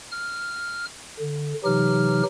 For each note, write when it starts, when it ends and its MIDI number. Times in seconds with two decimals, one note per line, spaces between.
0.11 0.85 89
1.20 1.54 50
1.65 2.23 48
1.65 2.23 52
1.65 2.23 54
1.65 2.23 63
1.65 2.23 67
1.65 2.23 89